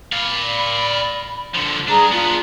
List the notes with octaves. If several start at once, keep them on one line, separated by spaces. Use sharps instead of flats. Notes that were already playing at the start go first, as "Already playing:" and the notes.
D5 F5 B5
D3 F3
G2 D4 G#4 A#5
B3 D4 F4